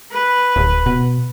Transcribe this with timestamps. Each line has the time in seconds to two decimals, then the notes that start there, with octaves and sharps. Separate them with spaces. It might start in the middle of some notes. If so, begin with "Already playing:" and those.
0.12 B4
0.56 D1
0.86 B2